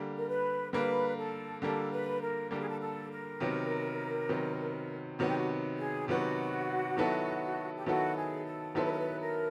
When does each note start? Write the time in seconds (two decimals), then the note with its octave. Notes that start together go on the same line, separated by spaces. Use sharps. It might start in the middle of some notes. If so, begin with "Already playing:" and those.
Already playing: D3 G3 A#3
0.17 A#4
0.28 B4
0.72 D3 G3 A#3 B4
1.17 A4
1.62 D3 G3 A#3 A4
1.92 B4
2.21 A#4
2.51 D3 G3 A#3 A4
2.60 G#4
2.68 A4
2.80 A4
3.11 A#4
3.40 C3 D#3 F#3 B3
4.29 C3 D#3 F#3 B3
5.19 C3 D#3 F#3 B3 F#4
5.27 G4
5.37 F#4
5.77 G#4
6.08 C3 D#3 F#3 B3 F#4
6.97 D#3 F#3 B3 E4 A4
7.77 G4
7.86 D#3 F#3 B3 E4 F#4 A4
8.16 G#4
8.46 A4
8.75 D#3 F#3 B3 E4 A4 C5
8.84 B4
8.91 A#4
8.99 B4
9.20 A#4